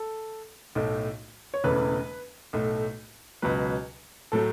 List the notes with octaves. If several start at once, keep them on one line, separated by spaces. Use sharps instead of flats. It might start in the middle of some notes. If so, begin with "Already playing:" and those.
Already playing: A4
B1 A2 A3
C#5
E1 E2 C#3 E3 A3 B4
B1 A2 A3
C#2 B2 F#3 B4
A2 F#3 A3 A4